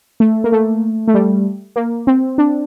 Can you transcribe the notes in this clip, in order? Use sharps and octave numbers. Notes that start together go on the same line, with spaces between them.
A3
A#3
A3
A3
G3
A#3
C4
D4